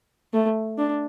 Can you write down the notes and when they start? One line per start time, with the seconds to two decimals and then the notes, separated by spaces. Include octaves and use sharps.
0.33 A3
0.78 D4